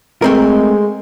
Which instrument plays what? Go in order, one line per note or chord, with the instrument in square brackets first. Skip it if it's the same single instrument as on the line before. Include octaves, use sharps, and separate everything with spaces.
[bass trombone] G#3 [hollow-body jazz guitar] A3 C4 A#4